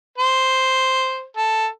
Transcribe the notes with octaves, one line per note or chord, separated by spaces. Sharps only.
C5
A4